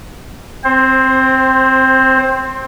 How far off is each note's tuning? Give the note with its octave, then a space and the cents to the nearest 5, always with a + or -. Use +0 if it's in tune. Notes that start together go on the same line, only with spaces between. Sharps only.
C4 +0 C5 +20